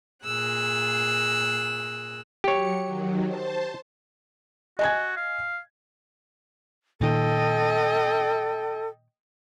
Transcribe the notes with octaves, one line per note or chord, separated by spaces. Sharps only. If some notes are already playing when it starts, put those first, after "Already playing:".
A#2 G#4 E6 F#6
F#3 G4 C#5 C#7
D#3 F#3
C5 A5
F#4 D#5 G#5 G#6
F5
A#2 D#3 A4 D#5 G5